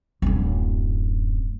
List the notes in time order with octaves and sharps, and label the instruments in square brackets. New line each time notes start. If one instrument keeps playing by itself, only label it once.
[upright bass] D1 F#2